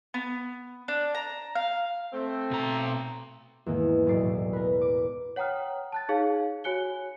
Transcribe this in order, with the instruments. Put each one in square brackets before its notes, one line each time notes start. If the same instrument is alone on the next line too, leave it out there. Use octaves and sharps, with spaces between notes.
[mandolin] B3
D4
A#5
F5
[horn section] A3 C4
[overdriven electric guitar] B2 A#5
[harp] E2 G#2 D#3 A#3
E1 B1 A2 D5 C7
A#4 B4
D6
[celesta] C#5 F#5 G5 A#5 D#6 F6
A5 F#6 A6
D#4 G#4 C#5 F5
F#4 C#5 G#5 F#6 C#7 G7